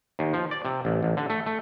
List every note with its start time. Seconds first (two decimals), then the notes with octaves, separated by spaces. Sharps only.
0.19 D#2
0.33 F3
0.51 D5
0.65 C3
0.85 A1
1.03 A1
1.17 D3
1.30 A3
1.46 A3